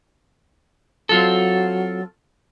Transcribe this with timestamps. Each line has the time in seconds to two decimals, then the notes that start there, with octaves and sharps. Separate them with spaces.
1.09 F#3 C4 F4 A4